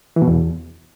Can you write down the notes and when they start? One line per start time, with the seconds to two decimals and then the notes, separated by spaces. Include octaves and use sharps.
0.16 E3
0.22 B2
0.27 E2